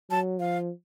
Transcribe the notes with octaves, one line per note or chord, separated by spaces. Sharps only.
F#3 A5
F3 F5